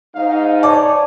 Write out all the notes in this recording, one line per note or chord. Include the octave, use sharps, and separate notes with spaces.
G#2 D#4 F5
C#5 D5 A5 D6